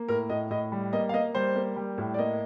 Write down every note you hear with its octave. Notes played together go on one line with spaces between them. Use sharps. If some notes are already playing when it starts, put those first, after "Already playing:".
Already playing: A#3
A2 A#4
A2 D#5
A2 D#5
G3
A#3 D#5
F5
A#3 D#5
G3 C5
A#3
G3
A2
D5
A#3 D#5